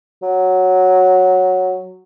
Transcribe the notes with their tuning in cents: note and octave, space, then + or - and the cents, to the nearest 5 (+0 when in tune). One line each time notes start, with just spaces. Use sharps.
F#3 -5